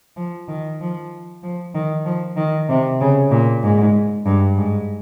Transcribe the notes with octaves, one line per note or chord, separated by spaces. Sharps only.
F3
D#3
F3
F3
D#3
F3
D#3
C3
C#3
A#2
G#2
G2
G#2